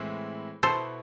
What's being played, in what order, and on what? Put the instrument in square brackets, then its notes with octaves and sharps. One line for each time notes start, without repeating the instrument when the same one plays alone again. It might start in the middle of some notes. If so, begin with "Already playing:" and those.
Already playing: [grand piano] A2 E3 G#3 C4 E4
[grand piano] B2 B3 E4 [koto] A4 C5